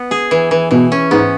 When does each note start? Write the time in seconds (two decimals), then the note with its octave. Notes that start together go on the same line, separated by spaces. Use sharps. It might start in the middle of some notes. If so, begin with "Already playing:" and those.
Already playing: B3
0.11 G#4
0.31 E3
0.51 E3
0.71 B2 E3
0.92 C#4
1.11 G#2 B3